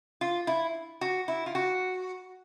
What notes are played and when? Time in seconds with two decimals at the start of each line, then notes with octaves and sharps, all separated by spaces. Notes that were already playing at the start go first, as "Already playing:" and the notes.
0.21 F4
0.47 E4
1.01 F#4
1.28 E4
1.46 F4
1.55 F#4